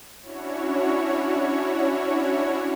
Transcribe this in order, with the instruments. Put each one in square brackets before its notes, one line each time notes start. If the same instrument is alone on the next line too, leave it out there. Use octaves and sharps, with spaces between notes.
[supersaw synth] C#4 D4 E4 F#4 C#5